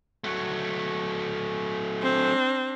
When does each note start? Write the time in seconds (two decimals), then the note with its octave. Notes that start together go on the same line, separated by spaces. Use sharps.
0.24 F#3 A3
2.01 C4 D4